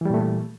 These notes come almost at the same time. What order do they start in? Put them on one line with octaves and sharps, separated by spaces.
E3 G3 A#2 A3